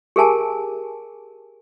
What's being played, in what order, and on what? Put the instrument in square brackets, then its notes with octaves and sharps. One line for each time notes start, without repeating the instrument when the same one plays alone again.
[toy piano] G4 G#4 A#4 G#5 A5